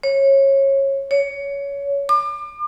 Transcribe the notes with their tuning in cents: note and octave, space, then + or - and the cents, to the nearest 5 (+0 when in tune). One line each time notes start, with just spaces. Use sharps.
C#5 -25
C#5 +20
D6 +35